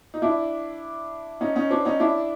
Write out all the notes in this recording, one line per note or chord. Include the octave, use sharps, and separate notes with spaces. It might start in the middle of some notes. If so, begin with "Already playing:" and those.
D#4
D4 E4
C#4 D#4
C#4 D#4
C4 D4
C#4 D#4
D4 E4